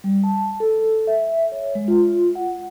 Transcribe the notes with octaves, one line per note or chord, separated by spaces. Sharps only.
G3
A5
A4
E5
C#5
G#3
F4
F#5